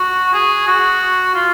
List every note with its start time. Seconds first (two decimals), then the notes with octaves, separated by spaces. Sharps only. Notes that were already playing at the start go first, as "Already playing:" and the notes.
Already playing: F#4
0.33 G#4
0.67 F#4
1.34 F4